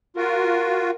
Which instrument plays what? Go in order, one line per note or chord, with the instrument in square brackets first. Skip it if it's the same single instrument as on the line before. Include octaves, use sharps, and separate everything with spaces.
[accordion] F4 F#4 [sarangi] A#4